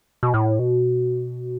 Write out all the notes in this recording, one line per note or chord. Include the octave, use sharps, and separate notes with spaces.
B2
A2
B2